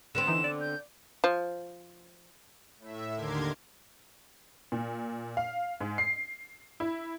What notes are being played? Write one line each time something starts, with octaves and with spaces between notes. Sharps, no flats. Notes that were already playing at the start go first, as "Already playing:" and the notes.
D3 B3 C4 E7
E3 D#4
D5
G6
F3
A2 E5
D#2 D3 A#4 C6 D6 G#6
A#2
F5
G#2
C7
E4